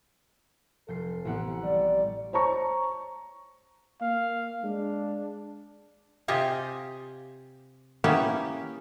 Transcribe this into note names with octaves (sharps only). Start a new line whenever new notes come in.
F1 A4 G6 C7
A1 B3 F#5
G3 D5
C5 C#5 A5 A#5 C#6
A#3 F5
G#3 D4
C3 F4 G4 D#5 G#5
A#3 B3 C#4 E4 G4